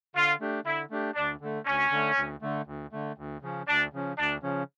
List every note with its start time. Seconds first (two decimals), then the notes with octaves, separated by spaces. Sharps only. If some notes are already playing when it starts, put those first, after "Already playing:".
0.15 D3 F4
0.40 A3 D4 G4
0.65 D3 E4
0.91 A3 D4 G4
1.16 D2 D4
1.41 D3 A3
1.66 D2 C#4
1.91 D3 A3
2.16 D2
2.42 D3 A3
2.66 D2
2.92 D3 A3
3.18 D2
3.42 C#3 F3 C#4
3.68 D2 D4
3.93 C#3 F3 C#4
4.18 D2 D4
4.43 C#3 F3 C#4